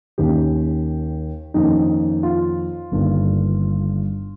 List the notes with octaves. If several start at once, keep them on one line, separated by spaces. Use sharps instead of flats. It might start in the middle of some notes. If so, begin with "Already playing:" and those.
D#2 D#3 A#3 C#4 G4
F2 D#3 A#3 C#4 D#4
F4
G1 G2 D#3 A#3